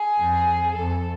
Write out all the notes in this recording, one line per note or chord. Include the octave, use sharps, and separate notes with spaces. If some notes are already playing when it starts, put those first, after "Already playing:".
Already playing: G#4
F2
F2 A4